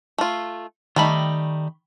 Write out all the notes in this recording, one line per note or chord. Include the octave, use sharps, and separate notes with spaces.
A3 F4
D#3 G3 A3 D#4 B5